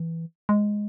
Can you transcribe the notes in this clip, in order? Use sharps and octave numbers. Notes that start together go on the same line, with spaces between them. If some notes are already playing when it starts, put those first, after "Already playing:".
Already playing: E3
G#3